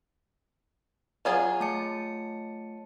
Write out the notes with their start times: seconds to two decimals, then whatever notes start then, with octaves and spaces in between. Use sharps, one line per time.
1.25 F#3 F4 G#4
1.60 A3 A5 C#7